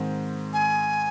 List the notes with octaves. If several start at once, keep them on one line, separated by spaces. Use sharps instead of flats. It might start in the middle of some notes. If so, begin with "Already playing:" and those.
Already playing: G#2 D#3 C4
G#5